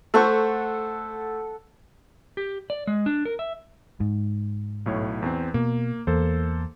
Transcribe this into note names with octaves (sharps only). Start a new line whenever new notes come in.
A3 A4 C5 F#5 C#6
G4
D5
G#3
D4
A#4
E5
G#2
B1 A2 C#5
E2 C4
B2 A#3
E2 A#3 A4 C5